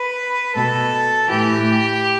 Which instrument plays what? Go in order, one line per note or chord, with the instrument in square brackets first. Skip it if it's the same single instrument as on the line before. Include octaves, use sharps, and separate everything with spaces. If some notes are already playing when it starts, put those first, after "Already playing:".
Already playing: [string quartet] B4
B2 A4
A2 E3 G4